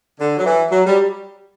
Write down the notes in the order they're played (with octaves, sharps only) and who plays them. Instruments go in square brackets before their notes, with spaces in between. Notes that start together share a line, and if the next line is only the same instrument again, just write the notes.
[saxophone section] D3
F#3
E3
F#3
G3